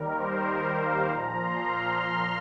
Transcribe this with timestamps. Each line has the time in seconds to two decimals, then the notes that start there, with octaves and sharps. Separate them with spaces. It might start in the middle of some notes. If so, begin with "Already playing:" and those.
Already playing: D#2 D#3 G3 A#4
0.18 C5
0.49 C5
0.79 F5
1.09 A#2 F3 A#5
1.39 C6
1.69 F6
2.00 C6